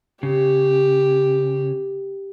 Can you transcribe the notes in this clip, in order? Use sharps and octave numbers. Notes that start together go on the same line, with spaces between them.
C#3 G4